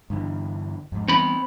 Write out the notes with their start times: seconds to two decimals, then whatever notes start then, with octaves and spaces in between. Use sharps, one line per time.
0.10 G2 D3 E3
0.92 F2 G#2
1.08 E3 G3 B3 C4 B5